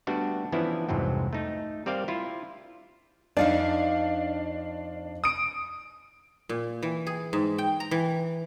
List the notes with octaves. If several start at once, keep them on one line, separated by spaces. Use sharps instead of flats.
G3 A3 B3 D4 F#4
E3 F3 B3 C#4 D4 E4
C2 F2 G#2 E3 F#3 C4
A3 D#4
G3 C4 A#4 D5 F5
E4 F4
F2 D4 D#4 D5 F5
D#6 D7
A#2
E3
G#4
G#2
G5
A#5
E3